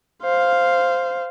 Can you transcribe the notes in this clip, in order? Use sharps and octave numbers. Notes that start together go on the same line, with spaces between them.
C5 F5